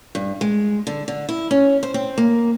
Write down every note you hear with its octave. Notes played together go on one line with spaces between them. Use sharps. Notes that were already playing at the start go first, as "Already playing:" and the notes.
G2
G#3
D3
D3
E4
C#4
C5
C4
A#3